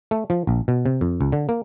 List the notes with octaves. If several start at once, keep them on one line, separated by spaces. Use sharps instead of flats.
A3
F3
A#1
B2
C3
F2
C#2
D3
A#3